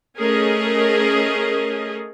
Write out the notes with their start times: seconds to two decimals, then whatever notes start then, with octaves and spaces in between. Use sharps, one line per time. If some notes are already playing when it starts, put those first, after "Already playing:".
0.18 A3 C#4 G#4 A#4 D#5